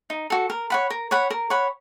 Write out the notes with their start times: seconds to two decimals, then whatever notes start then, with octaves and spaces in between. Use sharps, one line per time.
0.10 D#4
0.30 F#4 A4
0.50 A#4
0.70 C#5 F#5 B5
0.90 A#4
1.11 C#5 F#5 B5
1.30 A#4
1.50 C#5 F#5 B5